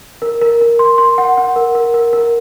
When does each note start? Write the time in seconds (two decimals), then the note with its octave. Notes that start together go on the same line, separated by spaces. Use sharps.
0.22 A#4
0.41 A#4
0.61 A#4
0.79 C6
0.98 C6
1.18 F#5
1.37 F#5
1.56 A#4
1.75 A#4
1.94 A#4
2.13 A#4